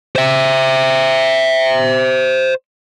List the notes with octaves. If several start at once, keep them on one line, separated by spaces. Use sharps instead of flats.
C5 E5